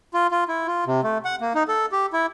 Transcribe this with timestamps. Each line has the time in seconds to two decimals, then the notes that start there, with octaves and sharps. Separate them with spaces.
0.14 F4
0.31 F4
0.48 E4
0.67 F4
0.86 C3
1.03 A3
1.25 F#5
1.41 A#3
1.55 D#4
1.68 A4
1.92 G4
2.13 E4